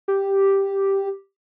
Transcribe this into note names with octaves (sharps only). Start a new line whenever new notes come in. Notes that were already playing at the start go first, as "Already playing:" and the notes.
G4